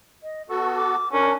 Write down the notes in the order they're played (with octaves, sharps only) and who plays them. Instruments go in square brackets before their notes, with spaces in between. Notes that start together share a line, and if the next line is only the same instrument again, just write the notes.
[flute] D#5
[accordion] B3 F#4 A4 [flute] C#6
[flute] D6
[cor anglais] C#4 [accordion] D4 [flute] A#4